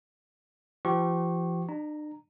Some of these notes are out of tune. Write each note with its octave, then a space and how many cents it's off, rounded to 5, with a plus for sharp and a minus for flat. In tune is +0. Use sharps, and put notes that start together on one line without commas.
F3 -40 G4 -30 C#6 -30
D4 +45 A#5 -5